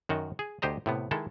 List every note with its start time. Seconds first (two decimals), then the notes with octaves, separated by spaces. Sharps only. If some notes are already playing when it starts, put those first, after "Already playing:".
0.09 F#2 D#3 F#4
0.39 G#4
0.62 D2 G4 C5 D#5 A#5
0.86 A2 C3 B3
1.11 D#3 G#3 E4 A4